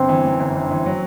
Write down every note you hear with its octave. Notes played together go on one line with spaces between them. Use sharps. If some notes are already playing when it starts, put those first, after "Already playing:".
Already playing: G1 C4
E3
F#2
G1
G1
E3
F#3